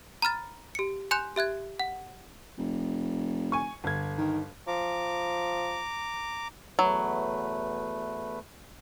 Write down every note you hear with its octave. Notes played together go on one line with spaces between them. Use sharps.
A#5 B5 F6 A6
G4 C#7
G#5 C6 F#6 G6 E7
G4 E5 F#6 G#6
F#5
F1
G#5 C#6
G1 G#6
D#3
F3 A#5 D6
E2 F#3 A3 B4